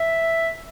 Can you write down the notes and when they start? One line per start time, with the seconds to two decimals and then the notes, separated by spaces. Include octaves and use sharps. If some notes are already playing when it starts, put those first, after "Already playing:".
Already playing: E5